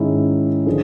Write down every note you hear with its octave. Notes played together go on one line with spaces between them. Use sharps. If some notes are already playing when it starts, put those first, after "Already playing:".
Already playing: G#2 D#3 G#3 C#4 E4
D3 F3 G#3